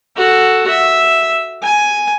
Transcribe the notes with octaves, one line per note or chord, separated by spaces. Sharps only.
F#4 A4
E5
G#5